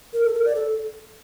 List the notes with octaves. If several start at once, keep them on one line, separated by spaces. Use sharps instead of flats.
A#4
A4
A#4
D5
A4